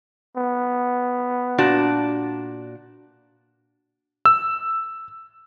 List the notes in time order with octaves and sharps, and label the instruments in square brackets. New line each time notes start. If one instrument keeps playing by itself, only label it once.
[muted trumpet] B3
[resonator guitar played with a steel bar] A#2 D4 F#4
[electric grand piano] E6